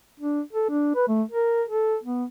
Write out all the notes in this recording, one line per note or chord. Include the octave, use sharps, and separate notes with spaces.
D4
A4
D4
B4
A3
A#4
A4
B3